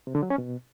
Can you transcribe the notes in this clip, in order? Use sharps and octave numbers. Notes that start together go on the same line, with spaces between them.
C3
D3
F#3
C#4
B2